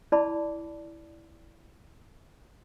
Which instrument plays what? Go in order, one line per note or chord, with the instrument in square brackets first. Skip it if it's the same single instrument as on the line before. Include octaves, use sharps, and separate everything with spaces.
[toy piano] E4 D5 A5 B5 D6